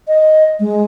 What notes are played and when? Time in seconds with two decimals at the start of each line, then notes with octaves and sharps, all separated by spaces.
0.08 D#5
0.60 G#3